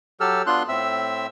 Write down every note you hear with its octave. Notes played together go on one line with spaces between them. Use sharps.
F#3 G4 A4 E6 F6
B3 D4 F4 C6 F#6
A2 C4 E5 E6